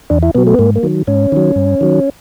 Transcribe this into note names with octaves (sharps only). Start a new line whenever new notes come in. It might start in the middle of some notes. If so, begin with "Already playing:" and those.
E2 D4
E4
B2 F#3 B3
A3
B3
G#2 A#3
A#3
D#3 F#3
G#2 C#4
D#3 F#3
G2
D#3 F#3